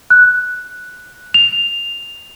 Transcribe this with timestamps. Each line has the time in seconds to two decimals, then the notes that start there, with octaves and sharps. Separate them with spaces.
0.10 F#6
1.34 F7